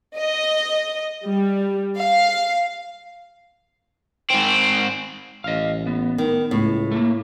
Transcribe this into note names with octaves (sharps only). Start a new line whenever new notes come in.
D#5
G3
F5
G#2 C4
A1 D#5 F5
B3
D#3
C#2 A2
A3 A#3